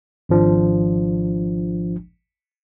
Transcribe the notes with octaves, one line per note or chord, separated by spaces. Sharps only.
G#1 F3 D4